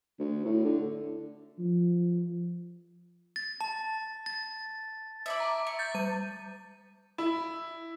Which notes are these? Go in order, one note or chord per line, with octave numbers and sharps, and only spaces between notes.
D2
A2
D3
F3
A6
A5
A6
E4 D5 E5
A#5
C#6
G6 A6
G3 D#7
E4